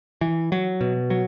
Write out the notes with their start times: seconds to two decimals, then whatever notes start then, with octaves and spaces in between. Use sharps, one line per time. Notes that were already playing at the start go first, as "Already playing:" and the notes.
0.21 E3
0.52 F#3
0.81 B2
1.10 F#3